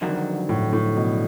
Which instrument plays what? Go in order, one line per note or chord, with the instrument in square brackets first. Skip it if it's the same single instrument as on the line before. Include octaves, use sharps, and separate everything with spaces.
[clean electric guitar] F2 D3 F#3 [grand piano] D#3
[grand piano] A2
A2
B2